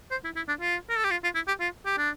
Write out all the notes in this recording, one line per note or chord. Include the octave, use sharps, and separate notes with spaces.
C5
E4
E4
D4
F4
A#4
A4
G4
F4
F4
E4
G4
F4
G4
D4